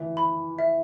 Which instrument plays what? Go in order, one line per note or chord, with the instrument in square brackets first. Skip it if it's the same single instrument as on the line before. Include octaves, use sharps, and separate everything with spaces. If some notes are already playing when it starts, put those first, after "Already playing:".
Already playing: [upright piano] E3 [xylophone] E5
[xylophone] B5
E5